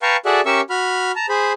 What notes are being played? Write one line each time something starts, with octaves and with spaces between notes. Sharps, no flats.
B4 F5 G5 A5 A#5 C#6
F#4 G#4 A4 D5 E5 F#5
C#4 G4 A#4 E5 C#6 E6
F#4 B5 F6
A5 A#5
G#4 C5 B5